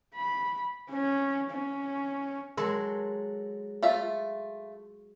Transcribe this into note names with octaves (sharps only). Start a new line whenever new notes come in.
B5
C#4
C#4
F#3 G#3 A4 A#4 C6
A3 F4 E5